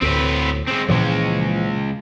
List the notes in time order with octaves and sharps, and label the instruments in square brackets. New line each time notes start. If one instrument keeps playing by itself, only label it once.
[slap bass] D2 A2 [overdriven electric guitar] C4 B4
[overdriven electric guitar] G#3 C4
[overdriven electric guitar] C#2 G#3 [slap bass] A#2 E3 F3